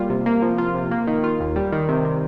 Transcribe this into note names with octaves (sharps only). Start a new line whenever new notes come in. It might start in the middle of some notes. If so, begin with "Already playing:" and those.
Already playing: G3 A#3 F4
C3
A#3
F3
F4
C3
A#3
D#3
F4
D#2
G3
D#3
C3
C3